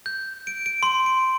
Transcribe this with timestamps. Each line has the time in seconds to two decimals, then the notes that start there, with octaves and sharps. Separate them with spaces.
0.06 G6
0.47 D7
0.66 D7
0.83 C6
1.06 D7